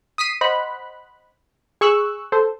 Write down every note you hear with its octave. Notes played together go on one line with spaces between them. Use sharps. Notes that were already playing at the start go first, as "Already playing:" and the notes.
D#6 B6 C7 D#7
C5 D#5 F#5 B5 F#6
G#4 C#6 E6 F#6
A4 C5